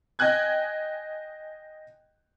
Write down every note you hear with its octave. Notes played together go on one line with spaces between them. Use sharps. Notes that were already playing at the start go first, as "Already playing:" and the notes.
D#5 G5 G#5 F#6 G#6